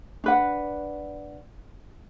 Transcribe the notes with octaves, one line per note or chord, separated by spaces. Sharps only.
D4 B4 F#5